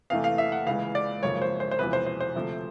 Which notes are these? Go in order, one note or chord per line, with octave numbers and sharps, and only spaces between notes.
E2 C3 E3 A3 F5
F5
E5
F#5
C#2 C#3 E3 G#3 F5
D5
G#1 F#2 C#3 F3 A#3 C#5
C5
C5
C5
E1 E2 C3 F3 B4
C5
C5
C5
D2 C3 F3 A3